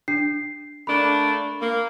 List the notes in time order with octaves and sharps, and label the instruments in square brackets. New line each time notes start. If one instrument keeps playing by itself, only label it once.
[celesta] D4 C7
[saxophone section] A3 A#3 D4 [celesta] B5
[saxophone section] A#3